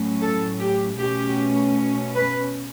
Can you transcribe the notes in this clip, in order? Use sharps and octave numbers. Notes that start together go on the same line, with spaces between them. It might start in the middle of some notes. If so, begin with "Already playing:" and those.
Already playing: A2 F#3 C#4
A4
G4
B2 A3 C#4 G4
B4